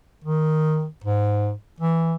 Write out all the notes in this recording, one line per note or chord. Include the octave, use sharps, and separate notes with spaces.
D#3
G#2
E3